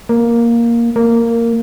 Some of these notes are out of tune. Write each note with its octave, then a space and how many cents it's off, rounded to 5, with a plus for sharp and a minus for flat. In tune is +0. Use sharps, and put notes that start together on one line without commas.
A#3 +5
A#3 -10